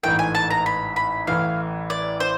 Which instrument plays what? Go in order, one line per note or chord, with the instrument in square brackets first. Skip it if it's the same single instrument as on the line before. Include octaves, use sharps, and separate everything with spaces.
[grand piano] A1 G#2 E3 A3 [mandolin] G5
[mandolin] G#5
A5
A#5
B5
B5
[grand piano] A1 A2 E3 [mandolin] F5
[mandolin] D5
C5